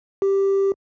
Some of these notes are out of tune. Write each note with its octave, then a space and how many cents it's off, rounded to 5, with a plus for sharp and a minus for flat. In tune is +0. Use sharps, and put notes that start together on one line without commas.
G4 +0